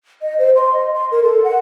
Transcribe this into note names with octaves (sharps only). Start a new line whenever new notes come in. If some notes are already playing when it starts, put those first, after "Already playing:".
D#5
C5
C6
D#5
C6
A#4
A4
F#5